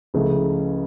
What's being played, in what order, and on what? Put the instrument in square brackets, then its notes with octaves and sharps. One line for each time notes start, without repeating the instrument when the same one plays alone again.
[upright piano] C#2 C#3 F3 A3 E4